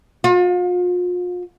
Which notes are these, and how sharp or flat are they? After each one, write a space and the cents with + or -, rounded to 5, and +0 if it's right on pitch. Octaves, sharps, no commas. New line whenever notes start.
F4 +40